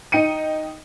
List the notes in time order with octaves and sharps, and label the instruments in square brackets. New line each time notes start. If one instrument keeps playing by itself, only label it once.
[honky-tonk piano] D#4 G5 C#7 D#7